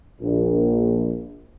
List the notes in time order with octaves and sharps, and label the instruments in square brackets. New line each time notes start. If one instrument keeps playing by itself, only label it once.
[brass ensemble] A#1